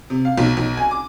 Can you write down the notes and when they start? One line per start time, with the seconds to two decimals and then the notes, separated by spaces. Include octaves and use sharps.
0.10 C3
0.25 F5
0.38 B1
0.57 B1
0.77 G#5
0.91 D6